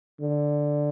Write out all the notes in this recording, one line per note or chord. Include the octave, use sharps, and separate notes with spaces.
D3